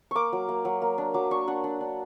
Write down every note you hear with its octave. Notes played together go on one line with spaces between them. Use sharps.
A#3 C#6 D6
F#3
A#3
F#3
A#3
D4
F#3 D6
D4 C#6
D4 F#5
D4
D4